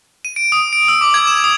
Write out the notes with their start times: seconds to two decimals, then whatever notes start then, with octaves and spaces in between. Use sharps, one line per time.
0.25 D#7
0.36 D7
0.52 D#6
0.73 D7
0.88 E6
1.01 D6
1.14 G#6
1.27 E7
1.44 D#6